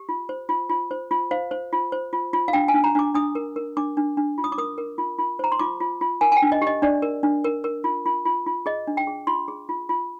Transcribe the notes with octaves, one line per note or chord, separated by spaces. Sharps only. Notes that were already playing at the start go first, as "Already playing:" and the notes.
Already playing: G4
F4
C5
F4
F4
C5
F4
C5 F5
C5
F4
C5
F4
F4
F5
D4 G5
G#5
D4
A#5
D4 D6
D4 D#6
A#4
A#4
D4 D6
D4
D4
F4
D#6
D6
A#4 D#6
A#4
F4
F4
C5 A#5
C6
F4 D6
F4
F4
A#4 G#5
G#5
G5
D4
D#5
G4
D#5
D4 D5
A#4
D4
A#4
A#4
F4
F4
F4
F4
G#4 D#5
D4
G5
G#4
F4 C6
G#4
F4
F4